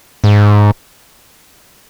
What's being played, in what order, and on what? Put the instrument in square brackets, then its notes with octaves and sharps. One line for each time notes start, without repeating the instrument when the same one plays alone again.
[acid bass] G#2